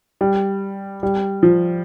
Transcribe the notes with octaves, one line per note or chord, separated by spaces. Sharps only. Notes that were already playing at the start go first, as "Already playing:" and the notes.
G3
G3
F3